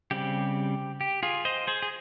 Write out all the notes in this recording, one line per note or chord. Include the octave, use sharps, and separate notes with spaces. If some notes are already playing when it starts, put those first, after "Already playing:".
C#3 G3 C4 G4
G4
F4 G#4
C5 D#5
G#4 C5
G#4